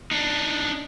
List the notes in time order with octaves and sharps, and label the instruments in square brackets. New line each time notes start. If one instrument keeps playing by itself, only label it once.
[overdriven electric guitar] D4 D#4